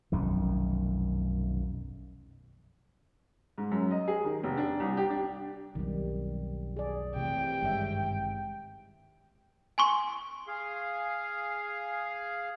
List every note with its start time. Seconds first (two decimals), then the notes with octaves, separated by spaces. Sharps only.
0.12 F1 B1 F#2 D#3
3.58 G#2
3.71 F#2
3.91 D#5
4.08 G#4
4.24 D#3
4.43 F1
4.57 D4
4.80 C2
4.97 G4
5.10 D4
5.75 B1 F2 D#3 G3
6.76 G#4 D5
7.16 C3 E3 A3 G5
7.62 G#1 G2 D#3 G#3 E5
9.78 G#5 C6 C#6
10.48 G#4 F5